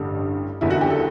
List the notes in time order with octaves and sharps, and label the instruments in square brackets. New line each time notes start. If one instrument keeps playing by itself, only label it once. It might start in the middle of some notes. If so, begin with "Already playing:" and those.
Already playing: [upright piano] A1 G2 D3 G3
F#1 E2 D3 E4
F#4
G4
A4